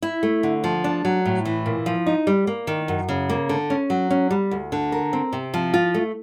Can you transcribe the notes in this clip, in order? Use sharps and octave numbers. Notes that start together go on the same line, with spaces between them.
E4
A3
D3
F3
D4
F#3
A2
E3
A#2
F3
D#4
G3
A#3
D#3
F#2
C#3
A#3
D3
C#4
F#3
C#4
G3
D2
D3
A#4
C4
C3
F3
F4
A3